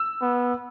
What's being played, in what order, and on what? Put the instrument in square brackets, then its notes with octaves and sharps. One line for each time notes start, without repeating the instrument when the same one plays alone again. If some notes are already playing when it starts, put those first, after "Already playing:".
Already playing: [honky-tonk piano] E6
[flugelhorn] B3